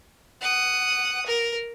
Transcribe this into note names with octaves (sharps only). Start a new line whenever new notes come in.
F#5 D#6
A#4